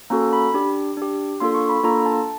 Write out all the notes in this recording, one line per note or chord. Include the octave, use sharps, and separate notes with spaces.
A#3 C#4 F#4 A4 A#5
B5
D4 G4
D4 G4
A#3 D4 F4 A4 C6
C#6
B5
A#3 D4 F4 A4 A#5
A5